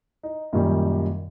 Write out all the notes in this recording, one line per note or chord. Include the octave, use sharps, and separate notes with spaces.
D#4
F#2 A#2 D#3 G3